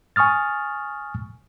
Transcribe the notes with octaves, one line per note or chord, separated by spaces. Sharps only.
G#5 C#6 D#6 F6 A6